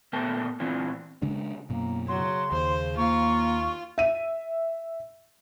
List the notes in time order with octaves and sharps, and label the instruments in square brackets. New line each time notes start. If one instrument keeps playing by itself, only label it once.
[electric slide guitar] A#2 A3 B3 A#4 G5 A5
A#2 E3 C4 D4 E4 F4
[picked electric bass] C#3 G#3 D4
[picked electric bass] F#2 B2 [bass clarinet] A#3
[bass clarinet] C#3 [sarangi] F#3 [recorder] C6
[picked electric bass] D#2 [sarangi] C5
[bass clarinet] A#3 [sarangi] F4 [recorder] C#6
[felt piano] E5 D#7